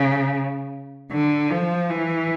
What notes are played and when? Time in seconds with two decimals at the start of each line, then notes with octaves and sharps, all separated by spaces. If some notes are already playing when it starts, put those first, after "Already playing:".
Already playing: C#3
1.12 D3
1.50 F3
1.90 E3